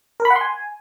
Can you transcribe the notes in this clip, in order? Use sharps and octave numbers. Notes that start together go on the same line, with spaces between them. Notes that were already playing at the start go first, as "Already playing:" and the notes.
A#4
B5
F#5
C6
G#5